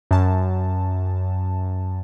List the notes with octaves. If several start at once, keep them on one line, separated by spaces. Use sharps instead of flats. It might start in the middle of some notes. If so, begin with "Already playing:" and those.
F#2 A5